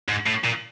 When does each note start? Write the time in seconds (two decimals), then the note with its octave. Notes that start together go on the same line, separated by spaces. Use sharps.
0.09 G#2
0.27 A2
0.45 A#2